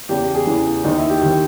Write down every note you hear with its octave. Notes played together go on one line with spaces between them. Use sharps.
E2 C#3 E3 G4
G#4
E2 C#3 E3
D#2 D#3 D#4
E4
G4
D#2 D#3 G4